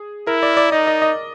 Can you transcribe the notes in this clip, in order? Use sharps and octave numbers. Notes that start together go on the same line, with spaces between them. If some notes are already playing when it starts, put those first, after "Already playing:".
Already playing: G#4
E4 A#4
D5
D5
D#4 D#5
D#5
D#5